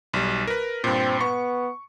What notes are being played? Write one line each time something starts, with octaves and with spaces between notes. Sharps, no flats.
B1 G3
A#4 B4
G2 A#2 C4
B3 C#6